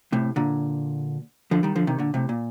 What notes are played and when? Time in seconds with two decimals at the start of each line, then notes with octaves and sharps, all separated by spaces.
0.12 A2 C3
0.36 A#2 D3
1.51 D3 F3
1.63 D#3 G3
1.76 D3 F3
1.87 C3 D#3
1.98 A#2 D3
2.14 A2 C3
2.29 A#2